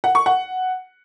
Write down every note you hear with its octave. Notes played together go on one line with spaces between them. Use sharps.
F#5
C#6
F#5